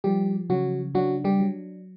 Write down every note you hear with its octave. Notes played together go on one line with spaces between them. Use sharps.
F3 G3 G4
C#3 F#3 F#4
F#3 D4 F#4
G3 G4
F#3